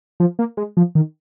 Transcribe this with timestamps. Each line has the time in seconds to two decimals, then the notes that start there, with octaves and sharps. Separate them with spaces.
0.20 F3
0.39 A#3
0.57 G#3
0.77 F3
0.95 D#3